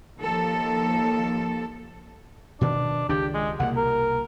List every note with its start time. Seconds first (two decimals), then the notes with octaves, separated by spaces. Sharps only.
0.20 D#2 F3 A4
2.61 B2 D#3 D4
3.09 C#2 D#3 D4 G4
3.34 G#3
3.60 C2 B2 A#3 F#5
3.77 A#4